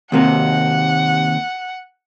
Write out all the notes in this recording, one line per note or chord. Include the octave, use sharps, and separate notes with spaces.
D#2 C3 A#3 F#5